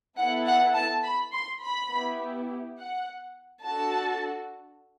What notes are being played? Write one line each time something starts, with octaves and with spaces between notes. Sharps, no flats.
B3 E4 A4 F#5
F#5
A5
B5
C6
B5
B3 E4 G4
F#5
D4 F#4 A4 A5